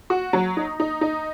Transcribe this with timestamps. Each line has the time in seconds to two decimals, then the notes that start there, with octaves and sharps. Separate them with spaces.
0.10 F#4
0.33 F#3
0.57 D#4
0.80 D#4
1.01 D#4